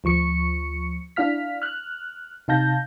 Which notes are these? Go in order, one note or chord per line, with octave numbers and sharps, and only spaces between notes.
D2 F3 C#6 C#7
D4 E4 F5 F6 B6
F6 F#6
C3 D#4 F5 A5 G6 A#6